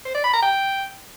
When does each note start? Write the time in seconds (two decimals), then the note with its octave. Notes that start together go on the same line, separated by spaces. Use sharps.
0.05 C5
0.15 D5
0.24 B5
0.33 A#5
0.43 G5